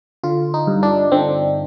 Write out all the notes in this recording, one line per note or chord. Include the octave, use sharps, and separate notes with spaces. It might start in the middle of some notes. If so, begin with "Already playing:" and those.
D3 F4
D#4
G2
D4
D3 C4